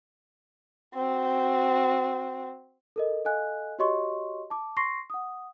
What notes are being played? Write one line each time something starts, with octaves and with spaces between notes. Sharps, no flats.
C4 F#4
A4 A#4 D#5
A4 D#5 F5 G#5 F#6
F#4 G4 C#5 D#5 C6 C#6
A5 D6
C6 C#6 A#6 C7
F#5 D#6